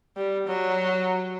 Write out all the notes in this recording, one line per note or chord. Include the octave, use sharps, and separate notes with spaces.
G3
F#3